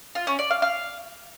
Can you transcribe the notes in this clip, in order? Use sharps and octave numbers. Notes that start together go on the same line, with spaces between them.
F4
C#4
D5
F5
F5